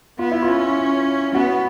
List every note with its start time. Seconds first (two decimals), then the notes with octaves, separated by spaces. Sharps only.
0.19 B3 F4
0.31 E4
0.42 F4
0.48 C#4
1.35 B3 F#4